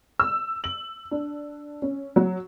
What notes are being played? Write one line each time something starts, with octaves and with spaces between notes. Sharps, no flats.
E6
F#7
D4
C#4
F#3